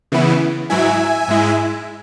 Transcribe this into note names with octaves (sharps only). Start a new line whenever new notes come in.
C#3 E3 B3 E4
G#2 F#3 E4 E5 G#5
G#2 G#3 E4